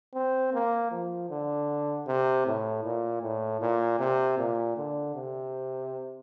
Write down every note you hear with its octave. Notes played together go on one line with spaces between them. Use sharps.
C4
A#3
F3
D3
C3
A2
A#2
A2
A#2
C3
A#2
D3
C3